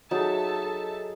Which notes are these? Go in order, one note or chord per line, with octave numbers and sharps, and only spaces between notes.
F#3 D#4 G#4 A4 E5 A5